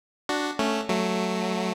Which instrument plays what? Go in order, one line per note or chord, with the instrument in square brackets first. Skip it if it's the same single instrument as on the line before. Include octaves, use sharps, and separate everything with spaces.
[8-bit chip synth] D4 F#4
A3 C#4
F#3 A3